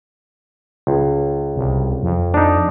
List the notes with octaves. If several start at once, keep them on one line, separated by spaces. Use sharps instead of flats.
C#2
C2
F2
D4 D#4